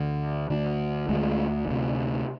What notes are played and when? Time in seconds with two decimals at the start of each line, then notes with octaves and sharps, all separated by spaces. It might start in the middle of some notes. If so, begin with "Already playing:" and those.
Already playing: D2 D3
0.50 D2 D3
1.09 D2 D3 G#3
1.68 D2 C3